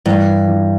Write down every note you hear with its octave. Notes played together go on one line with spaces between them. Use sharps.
G2 E3
E3